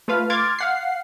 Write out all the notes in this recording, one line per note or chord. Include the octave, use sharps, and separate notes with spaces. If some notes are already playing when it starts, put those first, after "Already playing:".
A3 F4 B4 F5
C6 D6 F6 G#6 A6
F5 F#5 C7